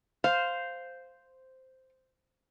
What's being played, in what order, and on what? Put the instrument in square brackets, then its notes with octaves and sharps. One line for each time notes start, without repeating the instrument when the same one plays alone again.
[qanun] C5 [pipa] F5